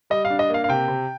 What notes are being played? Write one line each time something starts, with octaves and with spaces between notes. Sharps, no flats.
G3 D#5
F5
D4
D#5
A#3 F5
F5
C3 G5
C3